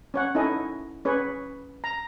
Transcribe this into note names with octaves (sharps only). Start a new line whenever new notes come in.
C#4 C#5 F#5
C#4 D#4 E4 A4 D#5 G#5
C#4 G#4 B4 C#5
A#5